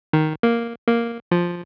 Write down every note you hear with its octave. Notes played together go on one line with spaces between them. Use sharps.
D#3
A#3
A#3
F3